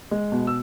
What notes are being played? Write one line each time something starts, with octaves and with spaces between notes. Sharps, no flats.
G#3
B2
E6